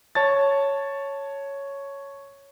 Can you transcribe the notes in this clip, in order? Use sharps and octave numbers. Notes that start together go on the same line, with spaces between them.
C#5 A5 A6